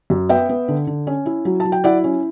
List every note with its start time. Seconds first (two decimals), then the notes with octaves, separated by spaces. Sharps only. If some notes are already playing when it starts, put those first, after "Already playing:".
0.10 F#2
0.29 B3 E5 G5
0.49 B3
0.68 D3
0.87 D3
1.07 C#4
1.26 E4
1.45 F#3
1.60 A5
1.65 F#3
1.72 G5
1.84 E4 D5 F#5
2.04 C#4